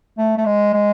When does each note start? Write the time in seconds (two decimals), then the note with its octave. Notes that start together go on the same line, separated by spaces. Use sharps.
0.18 A3
0.38 A3
0.46 G#3
0.74 G#3